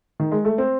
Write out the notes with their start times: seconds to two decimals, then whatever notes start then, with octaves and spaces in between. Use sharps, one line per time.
0.20 D#3
0.32 G#3
0.45 A3
0.58 C4